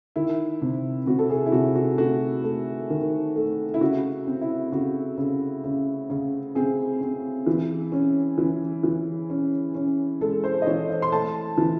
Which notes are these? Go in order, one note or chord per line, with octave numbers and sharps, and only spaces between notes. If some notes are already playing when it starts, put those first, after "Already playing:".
D#3 E4
C3
C3 F#4
A4
G#4
E4
C3 F#4
F#4
A3 F#4
A3
D#3
A3
E4
C#3 F#4
C4
E4
C#3 F#4
C#3
C#3
C#3
C4 G#4
C4
E3
C#4
E3
E3
C#4
C#4
G#3 A4
C5
D#5
E3 C#5
D#5
C6
A3 A5
E3